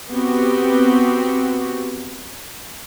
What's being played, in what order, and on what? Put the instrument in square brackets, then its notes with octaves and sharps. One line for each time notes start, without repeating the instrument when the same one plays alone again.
[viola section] B3 C4 F#4 G4